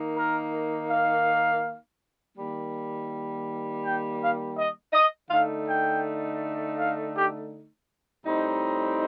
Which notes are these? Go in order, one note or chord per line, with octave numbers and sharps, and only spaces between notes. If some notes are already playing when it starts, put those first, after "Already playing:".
Already playing: D#3 A#3 D#4
A#4
F5
D#3 G3 A#3
G5
F5
D#5
D#5
D3 A3 D#4 F5
G5
F5
G4
A2 G3 C4 D#4